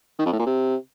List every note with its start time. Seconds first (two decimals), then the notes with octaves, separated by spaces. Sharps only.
0.19 D#3
0.26 F2
0.33 A2
0.39 A#2
0.46 C3